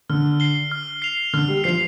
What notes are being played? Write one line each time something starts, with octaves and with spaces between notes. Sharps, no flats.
D3 F6
C7 G7
F6
C7 F7
D3 F6
G3
F3 C7 F7